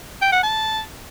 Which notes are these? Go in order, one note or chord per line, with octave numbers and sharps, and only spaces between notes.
G5
F#5
A5